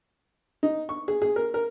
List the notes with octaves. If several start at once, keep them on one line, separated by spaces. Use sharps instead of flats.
D#4
C#6
G#4
G#4
A#4
A#4